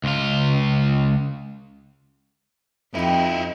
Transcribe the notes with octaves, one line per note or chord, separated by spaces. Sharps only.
C#2 F4
F2 D#4 E4 G4 G5